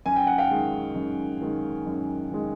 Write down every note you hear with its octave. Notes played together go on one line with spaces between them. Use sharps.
F#2 G#5
G5
F#5
F5 G5
D#3 G#3
F#2
D#3 G#3
F#2
D#3 G#3